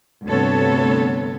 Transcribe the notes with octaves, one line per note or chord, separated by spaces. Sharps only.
D2 G2 C3 B3 A4 C#5